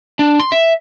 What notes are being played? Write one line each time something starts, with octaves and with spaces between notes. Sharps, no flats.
D4
C6
E5